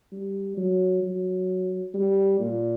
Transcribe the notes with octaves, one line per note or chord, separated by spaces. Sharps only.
G3
F#3
F#3
G3
A#2